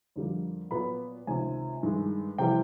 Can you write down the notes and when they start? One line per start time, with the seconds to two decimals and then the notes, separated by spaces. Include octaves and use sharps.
0.16 F2 D3 G3 A#3
0.71 A#2 F#3 B3 B5
1.27 C#2 C3 D#3 G#5
1.83 G2 D#3 G#3
2.38 C3 E3 G3 G5